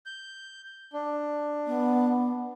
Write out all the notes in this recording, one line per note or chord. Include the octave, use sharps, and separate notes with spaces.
G6
D4
B3